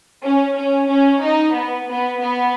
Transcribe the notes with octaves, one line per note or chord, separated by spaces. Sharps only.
C#4
C#4
C#4
D#4
B3
B3
B3